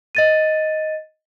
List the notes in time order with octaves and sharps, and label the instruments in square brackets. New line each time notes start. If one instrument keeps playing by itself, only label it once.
[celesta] D#5 A6 D#7